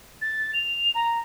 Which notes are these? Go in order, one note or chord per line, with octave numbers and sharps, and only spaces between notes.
A6
F7
A#5